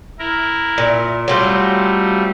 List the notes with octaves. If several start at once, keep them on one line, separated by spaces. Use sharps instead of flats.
E4 A#4
A#2
F#3 G3 A3 C4 F4